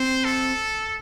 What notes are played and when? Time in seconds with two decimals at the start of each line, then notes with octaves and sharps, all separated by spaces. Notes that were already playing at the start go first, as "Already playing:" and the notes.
Already playing: C4 C5
0.25 A4